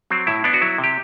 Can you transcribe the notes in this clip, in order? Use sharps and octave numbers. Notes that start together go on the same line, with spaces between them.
F#3 C4
A2 E4
B3 D4
F#4
F#3 E4
C3
G4